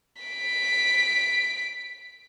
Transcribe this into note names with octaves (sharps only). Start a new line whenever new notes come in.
B6 D7